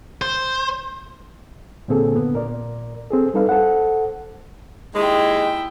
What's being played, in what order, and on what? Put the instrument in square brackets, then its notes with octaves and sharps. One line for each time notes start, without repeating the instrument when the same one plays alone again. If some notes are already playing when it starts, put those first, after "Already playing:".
[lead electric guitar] C5
[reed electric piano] A#2 D3 A#3 C4 G#4 A4
D3 B3
A#2 A#4 D5
C4 G#4 A4
G3 D#4 A4 B4 F5
A4 C5 F#5
[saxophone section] D#2 G#3 [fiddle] E4 G5